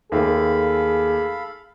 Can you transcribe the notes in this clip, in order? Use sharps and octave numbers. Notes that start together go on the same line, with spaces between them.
D#2 A3 G#4 A4 F5 B5